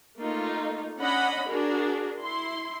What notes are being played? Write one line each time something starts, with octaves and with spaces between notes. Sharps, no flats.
A3 A#3 D#4 F4
C#4 D4 D#5 F#5 B5
D4 F#4 G#4 A#4
E4 C6